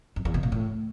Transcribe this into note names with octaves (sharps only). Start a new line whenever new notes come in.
F2
E2
B2
A#2
A2